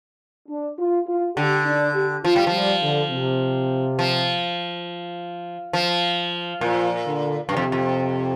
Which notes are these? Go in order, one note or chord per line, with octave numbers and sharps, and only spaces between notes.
D4
F4
F4
D3 G4
D4
G4
F3 F4
G3
F3
G3
D3
C3
F3
F3
A#2 F3
D3
G2 C3
F2
F2